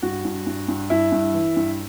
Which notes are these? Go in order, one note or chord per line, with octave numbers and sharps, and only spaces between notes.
G2 F#4
G2
G2
G2
G2 E4
G2
E3
G2